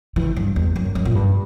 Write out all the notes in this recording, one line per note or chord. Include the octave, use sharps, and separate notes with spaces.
E3
G2
E2
F#2
F#2
A#2
G2